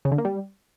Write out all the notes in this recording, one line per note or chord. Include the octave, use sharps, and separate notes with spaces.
C#3
D3
A#3
G3